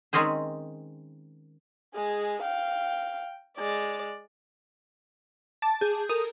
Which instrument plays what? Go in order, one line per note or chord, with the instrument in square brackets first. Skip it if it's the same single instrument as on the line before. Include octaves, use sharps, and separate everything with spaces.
[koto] D#3 G#3 C4 C#4 G#4 C5
[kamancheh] G#3 G#4
F5 G5
G#3 D5
[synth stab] A5 D6
[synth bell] G#4 G6
[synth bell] A4 A#4 [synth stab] D#6